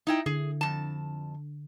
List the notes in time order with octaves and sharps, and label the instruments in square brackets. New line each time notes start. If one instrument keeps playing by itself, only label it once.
[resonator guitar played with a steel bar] D#4 E4 G5
[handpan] D3 [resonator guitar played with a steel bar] G#4
[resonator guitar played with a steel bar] F2 A5